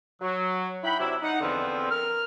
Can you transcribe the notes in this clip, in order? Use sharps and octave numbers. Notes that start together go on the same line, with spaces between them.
F#3
D#4 E4 F#5 G5 B5
C3 F#3 D4 E4
D#4 F#5
E2 D3 F3 B3 C4
A#4 F6